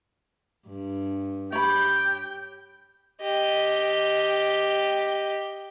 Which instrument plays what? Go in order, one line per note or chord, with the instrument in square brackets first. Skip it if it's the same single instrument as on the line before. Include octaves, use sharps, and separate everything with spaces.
[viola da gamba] G2
[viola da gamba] G4 [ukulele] C#5 B5 [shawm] G5
[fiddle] G4 D#5